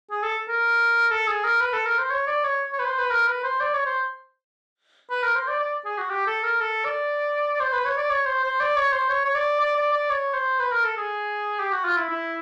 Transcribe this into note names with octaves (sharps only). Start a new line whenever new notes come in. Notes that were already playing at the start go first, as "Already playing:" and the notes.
G#4
A4
A#4
A4
G#4
A#4
B4
A4
A#4
C5
C#5
D5
C#5
C#5
B4
C5
B4
A#4
B4
C5
D5
C#5
C5
B4
A#4
C5
D5
D5
G#4
F#4
G4
A4
A#4
A4
D5
C5
B4
C#5
D5
C#5
C5
C5
D5
C#5
C5
C#5
C#5
D5
D5
D5
D5
C#5
C5
B4
A#4
A4
G#4
G4
F#4
F4
E4
E4